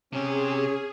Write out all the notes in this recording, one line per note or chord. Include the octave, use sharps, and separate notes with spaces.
C3 C#4 G4 G#4